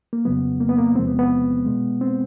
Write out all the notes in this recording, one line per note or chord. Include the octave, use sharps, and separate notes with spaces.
A#3
F2 C#3 F#3 B3
A#3
B3
A#3
E2 C3 F3 G#3 C4
B3
B3
B2 G#3
C4